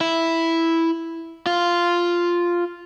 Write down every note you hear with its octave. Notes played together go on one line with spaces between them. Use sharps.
E4
F4